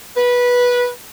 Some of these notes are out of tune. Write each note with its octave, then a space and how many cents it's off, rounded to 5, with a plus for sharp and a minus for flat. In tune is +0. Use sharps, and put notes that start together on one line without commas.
B4 -15